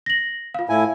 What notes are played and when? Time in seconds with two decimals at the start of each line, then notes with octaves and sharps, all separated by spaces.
0.06 A#6 F#7
0.54 F4 F5
0.69 A2 E4 G#5